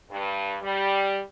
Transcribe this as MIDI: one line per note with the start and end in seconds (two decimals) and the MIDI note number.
0.11 0.57 43
0.62 1.20 55